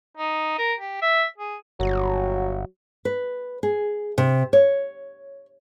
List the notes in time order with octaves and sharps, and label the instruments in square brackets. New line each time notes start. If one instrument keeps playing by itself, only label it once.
[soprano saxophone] D#4
A#4
G4
E5
G#4
[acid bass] G1 [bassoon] F#3
[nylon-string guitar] B4
G#4
C3
C#5